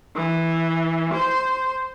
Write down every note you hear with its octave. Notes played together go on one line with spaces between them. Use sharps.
E3
C5